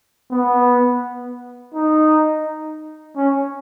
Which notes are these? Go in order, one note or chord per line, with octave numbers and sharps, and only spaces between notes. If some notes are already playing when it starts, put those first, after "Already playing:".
B3
D#4
C#4